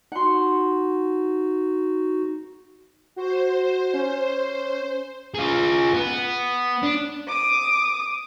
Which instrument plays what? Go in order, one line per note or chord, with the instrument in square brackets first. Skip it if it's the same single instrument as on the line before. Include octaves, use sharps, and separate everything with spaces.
[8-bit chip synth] D#4 F#4 [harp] F#5 C6
[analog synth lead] F#4 [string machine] C5
[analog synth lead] C#4
[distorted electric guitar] F4 G#4
B3
D4
[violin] D6 D#6